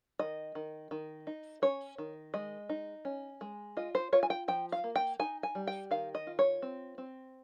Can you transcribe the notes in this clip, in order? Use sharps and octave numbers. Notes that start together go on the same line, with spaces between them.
D#3 D#5
D#3
D#3
D#4
C#4 C#5
D#3
G#3 D#5
D#4
C#4
G#3
F4 D#5
C5
F4 C#5
G#5
G5
F3 G5
F5
A#3
G5
D#4 G#5
G#5
G3
G5
D#3 F5
D#5
F4
C#5
C4
C4